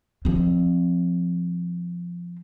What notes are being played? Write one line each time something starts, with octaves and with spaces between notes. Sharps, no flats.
F3 C4